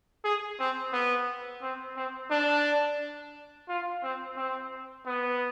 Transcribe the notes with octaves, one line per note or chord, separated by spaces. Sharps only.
G#4
C4
B3
C4
C4
D4
F4
C4
C4
B3